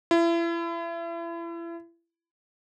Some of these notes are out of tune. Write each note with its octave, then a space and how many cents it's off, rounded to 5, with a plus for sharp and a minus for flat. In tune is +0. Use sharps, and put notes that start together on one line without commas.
E4 +35